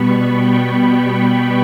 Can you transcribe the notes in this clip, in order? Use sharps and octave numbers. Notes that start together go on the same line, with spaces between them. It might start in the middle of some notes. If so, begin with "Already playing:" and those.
Already playing: B2 G3 B3 B5 C#6
G5